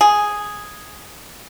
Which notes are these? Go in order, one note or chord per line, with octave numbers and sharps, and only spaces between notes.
G#4